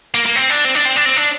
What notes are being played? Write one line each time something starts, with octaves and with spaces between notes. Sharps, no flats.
A#3
A#3
C4
D4
C4
D4
C4
D4
C4
D4